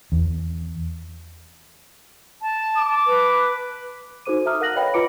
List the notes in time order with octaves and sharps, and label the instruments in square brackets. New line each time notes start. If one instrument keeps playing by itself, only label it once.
[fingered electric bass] E2
[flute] A5
[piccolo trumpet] D6
[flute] B4
[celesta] D#4 F#4 A4 C5 D6 D#7
A4 E5 A5 A#5 D#6 F6
A#4 F5 F#5 F#6 A#6 F#7
B4 C#5 D#5 F5 G5 B5
F4 B4 A#5 D6 C#7 D7